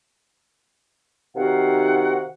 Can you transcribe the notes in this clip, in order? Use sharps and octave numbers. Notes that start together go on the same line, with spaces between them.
C3 D#3 D#4 F#4 F5 F#5